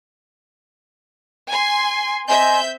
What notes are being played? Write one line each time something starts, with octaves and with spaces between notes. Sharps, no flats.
G#5 C6
C4 D#5 E5 G#5 C6 G6